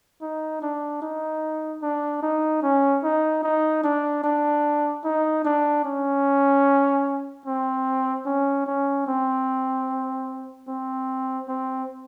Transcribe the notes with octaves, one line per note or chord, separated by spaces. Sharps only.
D#4
D4
D#4
D4
D#4
C#4
D#4
D#4
D4
D4
D#4
D4
C#4
C4
C#4
C#4
C4
C4
C4